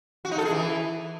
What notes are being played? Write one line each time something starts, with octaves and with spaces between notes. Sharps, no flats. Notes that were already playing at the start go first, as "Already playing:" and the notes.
F#4
D#4
A4
G#4
E3